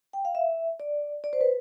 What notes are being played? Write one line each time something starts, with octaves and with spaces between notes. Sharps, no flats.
G5
F5
E5
D5
D5
C5
B4